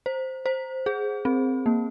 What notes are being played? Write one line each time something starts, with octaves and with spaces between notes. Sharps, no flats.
C5
C5
G#4
C4
A#3